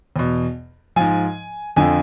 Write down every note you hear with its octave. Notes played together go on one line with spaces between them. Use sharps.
E2 B2
G#2 F3 G#5
F2 D3 F3 G#5